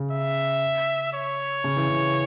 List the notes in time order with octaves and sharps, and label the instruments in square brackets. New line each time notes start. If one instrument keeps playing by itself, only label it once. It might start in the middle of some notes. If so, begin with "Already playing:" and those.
Already playing: [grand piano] C#3
[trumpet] E5
C#5
[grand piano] C#3
E3
C#3